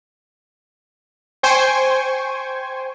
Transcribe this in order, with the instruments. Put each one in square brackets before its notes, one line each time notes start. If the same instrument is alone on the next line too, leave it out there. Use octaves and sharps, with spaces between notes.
[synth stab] C5 G5 G#5 C#6